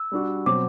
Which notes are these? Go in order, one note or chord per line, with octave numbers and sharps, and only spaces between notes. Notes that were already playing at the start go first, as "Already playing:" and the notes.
Already playing: E6
G3 D4 F#4
B2 F#3 C4 D6